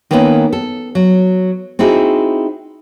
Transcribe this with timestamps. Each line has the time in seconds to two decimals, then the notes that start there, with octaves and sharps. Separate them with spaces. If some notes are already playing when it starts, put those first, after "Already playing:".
0.11 D#3 A#3 B3 C#4 A4 B4
0.53 A4
0.95 F#3
1.79 C4 D#4 E4 F#4 G#4